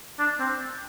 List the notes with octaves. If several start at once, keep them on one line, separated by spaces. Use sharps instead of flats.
D4
C4